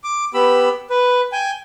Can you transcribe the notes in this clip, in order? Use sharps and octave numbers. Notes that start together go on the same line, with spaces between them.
D6
B3 G4 B5 E6
B4
G5 G#5